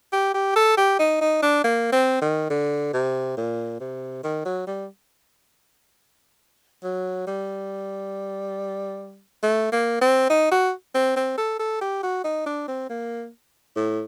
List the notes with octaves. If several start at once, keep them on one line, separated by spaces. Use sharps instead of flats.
G4
G4
A4
G4
D#4
D#4
D4
A#3
C4
D#3
D3
C3
A#2
C3
D#3
F#3
G3
F#3
G3
A3
A#3
C4
D#4
F#4
C4
C4
A4
A4
G4
F#4
D#4
D4
C4
A#3
A2